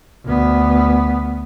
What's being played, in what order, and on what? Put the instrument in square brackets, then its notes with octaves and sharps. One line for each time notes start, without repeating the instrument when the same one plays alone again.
[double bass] D2 B3